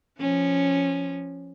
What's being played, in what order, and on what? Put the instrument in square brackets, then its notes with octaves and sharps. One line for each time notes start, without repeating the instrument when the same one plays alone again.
[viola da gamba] F3 C#4